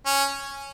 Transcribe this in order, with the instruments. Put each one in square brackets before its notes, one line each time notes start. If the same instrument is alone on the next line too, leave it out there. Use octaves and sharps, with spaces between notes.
[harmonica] C#4